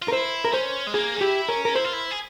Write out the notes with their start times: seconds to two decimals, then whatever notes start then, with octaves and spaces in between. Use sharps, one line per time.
0.02 F4
0.08 A#4
0.13 E4 C5
0.45 A#4
0.53 C#4 C5
0.87 G#3
0.94 A#3 G#4
1.15 C#4
1.21 E4 G4
1.49 C#4 A#4
1.65 A#4
1.75 E4 C5
1.84 F4
1.93 E4
2.11 G#4